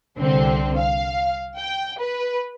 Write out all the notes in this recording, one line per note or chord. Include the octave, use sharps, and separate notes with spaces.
C2 D3 C4
F5
G5
B4